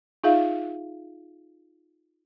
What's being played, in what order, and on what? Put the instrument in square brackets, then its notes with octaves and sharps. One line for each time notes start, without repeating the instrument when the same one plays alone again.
[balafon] D#4 F4 G#4 E5 F5